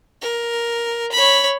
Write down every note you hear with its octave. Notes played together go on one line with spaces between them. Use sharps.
A#4
C#5 B5